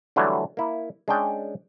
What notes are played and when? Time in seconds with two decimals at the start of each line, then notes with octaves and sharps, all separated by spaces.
0.16 D3 E3 F#3 G3 A3
0.57 A#3 E4
1.08 G#3 C#4 D4 D5 G5